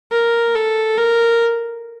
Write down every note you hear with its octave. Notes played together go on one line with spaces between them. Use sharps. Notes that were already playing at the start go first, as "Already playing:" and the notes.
A#4
A4
A#4